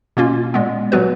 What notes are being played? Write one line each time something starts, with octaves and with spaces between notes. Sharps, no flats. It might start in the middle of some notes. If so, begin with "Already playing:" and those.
B2 A#3 C#4 F4
A#2 G#3 B3
A#2 F#3 B3 F#4 B4